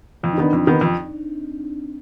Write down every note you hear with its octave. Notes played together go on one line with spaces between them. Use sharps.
F2 F4
D#4
D#3 B3 D4
F2 C4
D#3 B3
F2